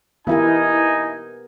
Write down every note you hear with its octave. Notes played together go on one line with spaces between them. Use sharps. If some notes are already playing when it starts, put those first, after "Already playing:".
E3 B3 D#4 E4 G4 A#4 G#5